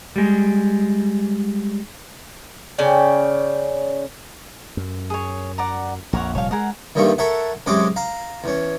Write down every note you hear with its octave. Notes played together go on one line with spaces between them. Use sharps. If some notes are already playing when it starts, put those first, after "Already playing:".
G3 G#3
C#3 C#4 D5 G5
F#2
G#4 C#5
D5 F#5 A#5
A#1 F2 A#4 C#5 F#5
F1 A#2 G3 C#5 F5
G#3 G#4 A#4 F#5
G2 A#2 D#3 G3 A3 C#6
A4 A#4 C#5 E5 F#5
F#2 C3 G#3 C#4 D#5 D6
F5 A#5
E2 C#4